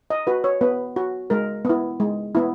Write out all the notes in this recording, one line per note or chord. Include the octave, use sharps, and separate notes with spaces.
D#5
F#4 B4
C#5
B3 B4
F#4
G#3 A#4
B3 E4
G#3
B3 E4